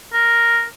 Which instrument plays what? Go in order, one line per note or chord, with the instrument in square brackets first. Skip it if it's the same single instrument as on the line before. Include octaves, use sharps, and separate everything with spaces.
[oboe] A#4